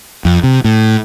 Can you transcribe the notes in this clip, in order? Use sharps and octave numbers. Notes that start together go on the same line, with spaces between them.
F2
C3
A2